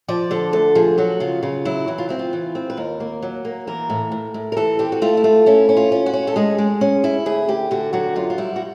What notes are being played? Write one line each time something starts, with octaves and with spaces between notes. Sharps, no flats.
F3 D5
D3 A4
D2 A4
F3 G#4
F#3 F#4
C#3 F4
C#3 F4
F#3 E4
E3 F#4
F4
C4 E4
F4
E3
C4
B4
D#2 A#4
A#3
F#3
A#3
E3 A#4
A2
A2
A2
A#4
E3 A4
C4 G4
F#4
A3 F4
E4
A3 F4
C#4 E4
C#4
F4
C#4
F#4
C#4
A4
G#3 G#4
G#3
C#4
E4
D2 G#4
D2 G4
D3 F#4
F#3 F#4
F#2 F4
F4
G3 E4
F#4